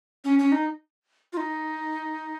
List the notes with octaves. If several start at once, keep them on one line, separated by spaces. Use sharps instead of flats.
C#4
C#4
D#4
F4
D#4